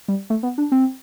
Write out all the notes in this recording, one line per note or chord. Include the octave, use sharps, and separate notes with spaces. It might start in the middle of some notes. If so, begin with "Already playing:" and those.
G3
A3
B3
D4
C4